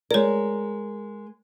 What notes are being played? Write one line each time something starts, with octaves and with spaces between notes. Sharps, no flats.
G#3 A#4 C#5 D5